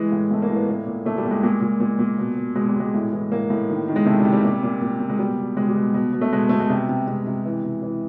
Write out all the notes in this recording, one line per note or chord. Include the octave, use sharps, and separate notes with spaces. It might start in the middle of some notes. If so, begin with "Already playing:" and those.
Already playing: E3 G#3
A2
A2 A3
A#3
A2
B3
A#2 A#3
A#2
A#2 A3
G3
A#2
G#3
A#2 G#3
A#2
A#2
A#2
B2
B2
B2 G#3
G3
B2 G#3
A2
E3
A2 A#3
A2
D#3
D#3
G#3
C3 A3
G3
C3
G3
A#2 G3
A#2
A#2
A#2
G#3
B2 G3
B2
B2 G#3
G3
B2
B2
B2
A3
B2 G#3
B2 A3
G#3
C3 G3
C3
C3 G#3
C3
E3
C3
E3